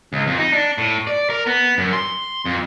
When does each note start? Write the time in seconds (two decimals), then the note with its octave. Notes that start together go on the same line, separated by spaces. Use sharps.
0.13 C#2
0.27 F2
0.39 D#4
0.53 D4
0.78 A2
1.07 D5
1.30 A#4
1.46 B3
1.78 F#2
1.93 C6
2.45 F2